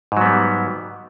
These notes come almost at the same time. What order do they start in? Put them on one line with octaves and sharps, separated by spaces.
G#2 F#3 B3 G3